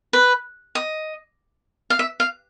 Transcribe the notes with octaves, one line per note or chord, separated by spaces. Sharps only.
B4
D#5
F5
E5
F5